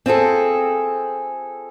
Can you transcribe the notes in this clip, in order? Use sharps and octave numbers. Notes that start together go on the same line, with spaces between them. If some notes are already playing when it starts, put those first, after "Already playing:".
C4 F4 G#4 A4